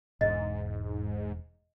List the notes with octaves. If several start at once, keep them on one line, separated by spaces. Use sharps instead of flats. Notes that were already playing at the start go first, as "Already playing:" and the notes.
E1 G#2 D#5